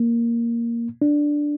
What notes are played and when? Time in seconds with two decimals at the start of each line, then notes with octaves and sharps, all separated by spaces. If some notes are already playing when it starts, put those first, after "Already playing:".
Already playing: A#3
1.02 D4